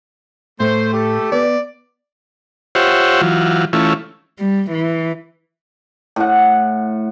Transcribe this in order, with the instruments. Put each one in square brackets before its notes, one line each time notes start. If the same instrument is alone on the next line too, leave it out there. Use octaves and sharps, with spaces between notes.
[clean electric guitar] A2 [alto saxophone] A3 [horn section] C5
[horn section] G4 A4
[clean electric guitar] B3 B4 [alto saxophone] D5
[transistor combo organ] F4 G4 C5 C#5 E5 F#5
E3 F#3 F4
E3 A3 C#4 E4 F4
[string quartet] G3
E3
[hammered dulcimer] A2 F#5